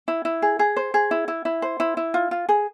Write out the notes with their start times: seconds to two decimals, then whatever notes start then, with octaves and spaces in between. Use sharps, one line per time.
0.08 E4
0.25 E4
0.42 G#4
0.59 G#4
0.76 C5
0.94 G#4
1.11 E4
1.28 E4
1.45 E4
1.62 C5
1.80 E4
1.97 E4
2.14 F4
2.31 F4
2.49 G#4